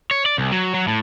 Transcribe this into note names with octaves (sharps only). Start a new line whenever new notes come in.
C#5
D5
C2
F#3
F#3
A2